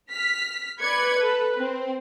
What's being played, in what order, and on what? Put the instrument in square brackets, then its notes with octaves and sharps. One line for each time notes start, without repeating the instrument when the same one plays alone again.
[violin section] F6 B6
[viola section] B4 [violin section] D5 G#6 C#7
[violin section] A4
C4